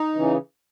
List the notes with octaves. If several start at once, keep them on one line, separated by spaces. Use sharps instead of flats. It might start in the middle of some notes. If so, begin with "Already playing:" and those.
Already playing: D#4
C#3 E3